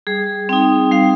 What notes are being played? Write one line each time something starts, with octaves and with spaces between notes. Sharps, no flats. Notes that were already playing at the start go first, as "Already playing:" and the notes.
G3 G#4
C4 D#4 G5
G3 F5